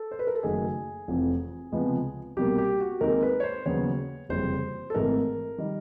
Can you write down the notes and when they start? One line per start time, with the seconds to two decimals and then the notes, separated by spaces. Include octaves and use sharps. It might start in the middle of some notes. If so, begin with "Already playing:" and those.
Already playing: A4
0.11 C5
0.19 B4
0.27 A#4
0.35 A4
0.43 F#1 F#2 D#3 F#3 A3 G#4
1.08 F1 F2 C3 E3
1.72 C#2 C3 F3 G#3 B3
2.36 C2 B2 G3 A#3 G4
2.58 G4
2.80 F#4
3.01 D#2 D#3 G#3 C4 A#4
3.23 B4
3.40 C#5
3.43 C5
3.66 D#2 C#3 F#3 B3 C#5
4.29 F#1 F2 C3 E3 G3 C5
4.90 A4
4.95 G#1 G#2 E3 A3 C4 A#4
5.58 D#3 G3